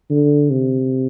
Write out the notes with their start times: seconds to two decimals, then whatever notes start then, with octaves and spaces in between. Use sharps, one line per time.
0.10 D3
0.50 C3